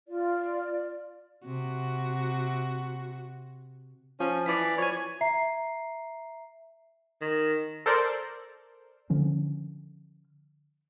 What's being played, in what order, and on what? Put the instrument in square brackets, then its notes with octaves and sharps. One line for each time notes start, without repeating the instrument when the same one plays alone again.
[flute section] F4 D5
[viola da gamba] C3 F#4
[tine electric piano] F3 [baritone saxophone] C#4
[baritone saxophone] E3 [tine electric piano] D5 B6
[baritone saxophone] F3 [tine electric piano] C#5 G#5
[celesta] E5 A#5 C7
[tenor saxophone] D#3
[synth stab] A4 A#4 C5 D5
[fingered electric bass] D3 F3 C#4